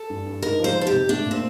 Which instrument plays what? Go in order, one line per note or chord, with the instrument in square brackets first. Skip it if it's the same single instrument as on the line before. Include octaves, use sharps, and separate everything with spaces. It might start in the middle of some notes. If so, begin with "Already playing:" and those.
Already playing: [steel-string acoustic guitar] A4
[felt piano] G2
G2
[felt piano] D#4 [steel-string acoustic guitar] A#4
[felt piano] F3 [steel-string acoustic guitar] C5
[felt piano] D#4
[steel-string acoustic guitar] A4
G4
[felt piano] C3
[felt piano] A3 [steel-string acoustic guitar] D4
[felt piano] A#2
[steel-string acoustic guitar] C4